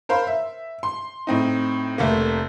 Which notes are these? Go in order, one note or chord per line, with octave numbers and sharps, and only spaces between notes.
A#4 C5 F5 B5
E5
C6
A2 C4 D#4
F1 A3 A#3